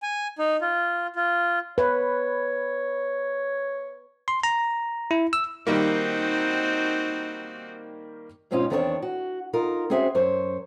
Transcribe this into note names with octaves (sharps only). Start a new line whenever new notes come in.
G#5
D#4
F4
F4
B4 C#5
C6
A#5
E4
E6
D#3 G3 A#3 C4 D#4 F#4
G#2 B2 C4 C#4 D#4 F4
E2 D#3 C4 D4 A#4 C#5
F#4
D#4 F4 A#4
C4 C#4 F#4 G#4 C5 E5
F#2 C5 C#5